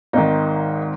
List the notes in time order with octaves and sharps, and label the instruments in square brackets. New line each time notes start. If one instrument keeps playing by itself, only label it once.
[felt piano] G#1 G#2 D#3 D#4